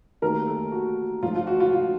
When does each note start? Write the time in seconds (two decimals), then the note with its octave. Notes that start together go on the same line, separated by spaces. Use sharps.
0.22 D#2 D#3 F#3 A3 A#4
0.48 A4
0.72 F#4
1.22 G#2 F3 A3 F4
1.36 F4
1.47 F#4
1.60 F4
1.73 F4